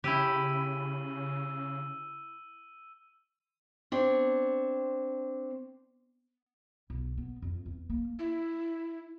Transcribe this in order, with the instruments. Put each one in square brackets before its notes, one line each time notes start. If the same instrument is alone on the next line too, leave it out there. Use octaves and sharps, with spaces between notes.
[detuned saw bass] C#3 [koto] E4 G4 [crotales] E6 D#7 G7
[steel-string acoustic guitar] C4 D4 C#5
[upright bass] B1
B3
F2
E2
A#3
[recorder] E4